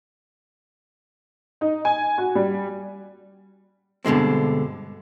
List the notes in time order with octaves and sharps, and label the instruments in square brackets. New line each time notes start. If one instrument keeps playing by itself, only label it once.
[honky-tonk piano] D#4
G#5
F#4
G3
[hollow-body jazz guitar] G2 B2 D3 G#3 C4